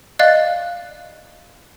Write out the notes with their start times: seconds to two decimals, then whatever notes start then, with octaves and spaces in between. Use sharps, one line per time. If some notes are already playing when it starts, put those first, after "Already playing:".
0.19 D5 D#5 F5 F#6 A6 C7